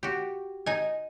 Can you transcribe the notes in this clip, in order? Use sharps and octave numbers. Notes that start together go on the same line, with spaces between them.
F#4 G4
D#4 D#5 G#5